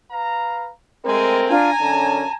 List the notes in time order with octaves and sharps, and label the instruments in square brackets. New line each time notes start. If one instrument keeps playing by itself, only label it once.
[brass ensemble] B4 F5 A#5
[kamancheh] G#3 G#5 [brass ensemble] A3 C4 [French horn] A#4
[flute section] D4 F4 [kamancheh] G#5 A#5
[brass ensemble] F#2 C#4 [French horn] D3 [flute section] A5